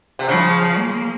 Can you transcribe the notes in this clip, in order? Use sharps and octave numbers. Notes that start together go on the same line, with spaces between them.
C3
C#3 F3
A#3